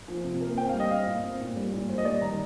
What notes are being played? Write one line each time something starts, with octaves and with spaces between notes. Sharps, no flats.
F3
C3
A#3
C4 G5
G3 F5
D#5
C4 F5
A#2
C4
A#2
G3
A#2
G3 C5
D#5
G3 D5
D#3 A#5